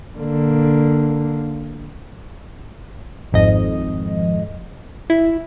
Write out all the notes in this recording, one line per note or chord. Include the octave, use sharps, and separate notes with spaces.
D3 A#3
G#1 F2 G#2 D#5
E4